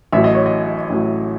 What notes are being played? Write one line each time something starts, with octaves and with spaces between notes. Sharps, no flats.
A1 A2 F#3 E5
D#5
C#5
D#5
A1 A2 F#3